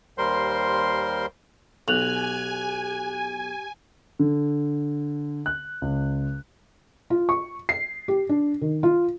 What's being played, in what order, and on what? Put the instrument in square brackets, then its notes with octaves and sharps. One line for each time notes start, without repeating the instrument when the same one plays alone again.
[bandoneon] D#2 G3 A#4 C5 C6
[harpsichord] B1 [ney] G4 [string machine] G#5 [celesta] F#6 F7 F#7
[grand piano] D3
F#6
C#2
[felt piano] F4
C#6
C7
G4
D4
D#3
F4